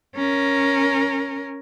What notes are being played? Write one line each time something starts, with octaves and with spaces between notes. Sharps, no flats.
C#4 A#4